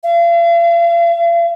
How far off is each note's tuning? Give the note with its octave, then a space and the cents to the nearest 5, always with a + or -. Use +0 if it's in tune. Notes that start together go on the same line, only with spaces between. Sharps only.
F5 -45